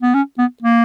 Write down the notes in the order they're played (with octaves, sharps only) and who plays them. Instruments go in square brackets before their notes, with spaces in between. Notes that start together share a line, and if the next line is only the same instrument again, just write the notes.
[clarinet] B3
C#4
B3
A#3